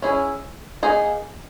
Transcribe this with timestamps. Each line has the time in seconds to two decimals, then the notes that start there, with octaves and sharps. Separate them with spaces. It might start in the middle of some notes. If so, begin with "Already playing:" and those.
0.02 C#4 E4 G#4
0.83 A#3 D#4 G#4